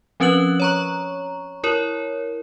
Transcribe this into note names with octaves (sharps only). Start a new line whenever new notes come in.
F3 C4 C#4 B4 F#6 F#7
C#5 A#5 C#6
E4 A#4 C#5